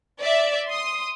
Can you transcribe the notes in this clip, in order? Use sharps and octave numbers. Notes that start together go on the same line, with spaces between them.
D5 E5
C6 D#6